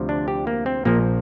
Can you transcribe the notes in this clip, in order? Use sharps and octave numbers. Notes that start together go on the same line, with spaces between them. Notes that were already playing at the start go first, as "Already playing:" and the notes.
Already playing: D2 C3 F3
D4
G4
A#3
C4
A#1 A#2 F3 A#3